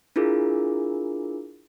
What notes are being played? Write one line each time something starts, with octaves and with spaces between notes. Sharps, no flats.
D4 E4 F4 G#4 A#4